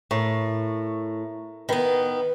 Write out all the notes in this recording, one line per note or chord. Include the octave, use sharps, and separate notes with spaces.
A2 A#4 C#6
D#3 B3 B4